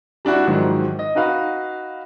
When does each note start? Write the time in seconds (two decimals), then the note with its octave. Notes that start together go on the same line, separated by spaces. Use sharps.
0.25 G3 D4 E4 F#4
0.47 G#2 D#3 F3 F#3
0.99 D#5
1.15 D#4 F#4 B4 F5